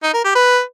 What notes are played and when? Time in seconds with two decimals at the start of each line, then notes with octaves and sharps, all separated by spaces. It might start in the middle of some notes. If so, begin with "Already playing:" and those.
0.03 D#4
0.14 A#4
0.24 G4
0.35 B4